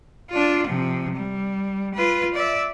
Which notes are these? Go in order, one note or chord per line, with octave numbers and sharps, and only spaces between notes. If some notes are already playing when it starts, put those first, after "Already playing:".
D4 F4
C3 F3
G3
F4 B4
D5 E5